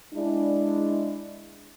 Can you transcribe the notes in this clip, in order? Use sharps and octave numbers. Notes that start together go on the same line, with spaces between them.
G#3 D4 E4